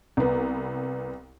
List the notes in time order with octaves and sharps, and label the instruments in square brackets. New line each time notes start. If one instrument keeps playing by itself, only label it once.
[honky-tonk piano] C2 B3